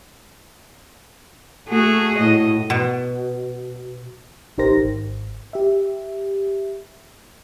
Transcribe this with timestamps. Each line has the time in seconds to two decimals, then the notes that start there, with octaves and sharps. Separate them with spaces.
1.69 A3 F#4 G#4
2.19 A2 D#5
2.70 B2
4.58 A1 D#4 G4 A#4 C5 A#6
4.77 G#1
5.53 G4 E5